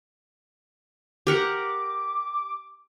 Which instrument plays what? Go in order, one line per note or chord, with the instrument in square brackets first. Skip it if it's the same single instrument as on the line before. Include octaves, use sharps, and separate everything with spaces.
[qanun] G4 A#4 F#5 [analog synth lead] D6